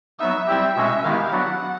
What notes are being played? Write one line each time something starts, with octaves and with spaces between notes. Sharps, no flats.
F#3 B3 D#4 E5
G3 C4 E4 G4 E5
B2 G#3 C#4 F#4 E5
D#3 G#3 B3 E4 G4 F5
F#3 B3 D4 F#4 F#5